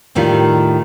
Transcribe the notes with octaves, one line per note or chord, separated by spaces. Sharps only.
D#2 A2 D#3 G3 F4